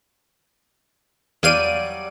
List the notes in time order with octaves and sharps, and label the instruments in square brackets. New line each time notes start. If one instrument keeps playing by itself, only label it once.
[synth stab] E2 F5 D#7 [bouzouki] F#3 G3 D5